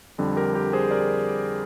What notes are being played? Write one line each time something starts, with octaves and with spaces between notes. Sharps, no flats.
F2 D3 G3
G4 A#4
G4 A#4
G#4 C5
A#4 D5